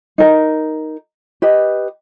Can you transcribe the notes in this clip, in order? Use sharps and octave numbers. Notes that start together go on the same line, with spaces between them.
D#4 A#4
G4 B4 D#5